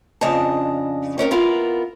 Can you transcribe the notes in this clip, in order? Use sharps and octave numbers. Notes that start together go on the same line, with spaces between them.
F2 C#3 D4 D#5 A5
C4 C#4 A#4 C#5
B3 E4 F4 A#4